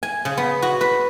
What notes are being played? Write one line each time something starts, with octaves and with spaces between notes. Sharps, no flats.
G#5
C#3
B3
F#4
B4